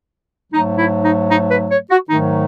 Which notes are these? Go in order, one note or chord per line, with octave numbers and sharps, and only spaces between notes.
G#2 F#3 A3 D#4
E4
D#4
D#4
B4
C#5
F#4
G#2 D#3 F#3 A3 D#4